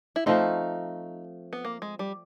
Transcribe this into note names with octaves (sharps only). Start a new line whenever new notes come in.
E4
F3 A3 C4 D#4
B3
A#3
G#3
G3